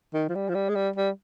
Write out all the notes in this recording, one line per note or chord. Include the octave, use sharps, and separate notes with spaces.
D#3
F3
G3
F3
G3
G#3
G3
G3